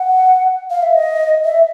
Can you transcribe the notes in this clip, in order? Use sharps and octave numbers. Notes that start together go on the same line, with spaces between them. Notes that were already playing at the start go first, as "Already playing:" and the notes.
Already playing: F#5
F5
E5
D#5
E5